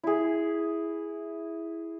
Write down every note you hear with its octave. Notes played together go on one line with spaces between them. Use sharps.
E4 G#4